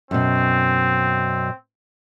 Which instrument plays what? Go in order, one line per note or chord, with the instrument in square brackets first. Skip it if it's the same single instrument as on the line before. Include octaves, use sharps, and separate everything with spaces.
[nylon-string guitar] F#2 B2 [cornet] C4